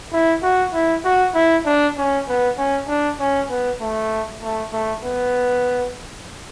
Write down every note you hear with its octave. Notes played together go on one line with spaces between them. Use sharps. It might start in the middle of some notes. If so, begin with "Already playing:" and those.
E4
F#4
E4
F#4
E4
D4
C#4
B3
C#4
D4
C#4
B3
A3
A3
A3
B3